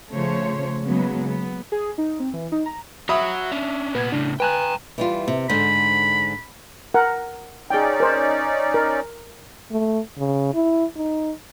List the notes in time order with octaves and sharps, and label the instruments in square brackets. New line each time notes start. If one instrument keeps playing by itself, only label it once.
[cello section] C#3 F3 A3 C5 C#5
C#3 F#3 G#3 A#3 B3
B3
[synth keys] G#4
D#4
C4
E3
D#4
A#5
[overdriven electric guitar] F#4 C#5 [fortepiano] E5 B5 D#6
[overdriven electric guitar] C#4 D4
[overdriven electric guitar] A#2 B3 [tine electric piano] B4 G#6
[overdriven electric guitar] A2 C#3 [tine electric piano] D4
[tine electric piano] B4 G#5 F#6 [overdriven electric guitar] G5 A#5
[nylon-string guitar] E3 G3 F4
C3
[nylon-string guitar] G#2 D3 C5 [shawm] B5
[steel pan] A#4 F#5
[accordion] C#4 D#4 D5 [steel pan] G#4 G5
[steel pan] A#4 C5
A#4
[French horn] A3
C#3
E4
D#4